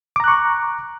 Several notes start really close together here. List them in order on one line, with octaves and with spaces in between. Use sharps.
D6 A#5 F#6 C#6